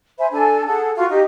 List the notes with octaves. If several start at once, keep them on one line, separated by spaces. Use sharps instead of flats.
C5 E5 G#5 B5
D4 A4 G#5
G#4 A4 F#5 A5
F4 F#4 F5 C#6
D#4 G4 D#5